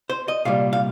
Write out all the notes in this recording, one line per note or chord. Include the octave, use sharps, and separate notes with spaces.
C5
D#5
C2 A#2 G3 F5
F5